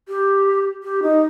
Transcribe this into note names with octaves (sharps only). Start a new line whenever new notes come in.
G4
G4
D#4